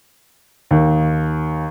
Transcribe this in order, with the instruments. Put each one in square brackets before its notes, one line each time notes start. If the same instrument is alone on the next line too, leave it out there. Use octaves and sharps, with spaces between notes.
[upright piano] D#2